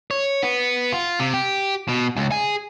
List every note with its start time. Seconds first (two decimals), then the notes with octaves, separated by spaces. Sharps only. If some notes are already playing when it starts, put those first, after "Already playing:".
0.11 C#5
0.42 B3
0.92 F4
1.19 C3
1.34 G4
1.88 B2
2.16 C#2
2.32 G#4